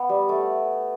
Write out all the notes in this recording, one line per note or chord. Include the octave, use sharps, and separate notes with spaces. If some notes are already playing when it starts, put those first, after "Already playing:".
Already playing: B3
G3
A3